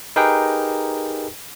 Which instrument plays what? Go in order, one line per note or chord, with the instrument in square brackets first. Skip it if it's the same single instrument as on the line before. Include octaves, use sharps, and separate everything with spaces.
[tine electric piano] D#4 G4 G#4 A#4 B4 G5